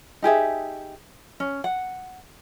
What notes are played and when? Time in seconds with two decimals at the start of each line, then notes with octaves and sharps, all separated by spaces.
0.22 D#4 G4 G#4 E5
1.40 C#4
1.64 F#5